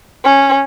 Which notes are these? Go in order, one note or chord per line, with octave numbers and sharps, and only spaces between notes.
C#4